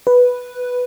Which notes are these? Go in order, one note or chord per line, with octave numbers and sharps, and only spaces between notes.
B4